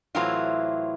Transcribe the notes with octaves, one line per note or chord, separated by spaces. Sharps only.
A2 E3 F#3 C4 E4 F4